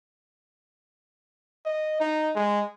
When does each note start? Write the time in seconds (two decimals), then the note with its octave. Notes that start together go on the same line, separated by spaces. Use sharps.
1.66 D#5
2.00 D#4
2.35 G#3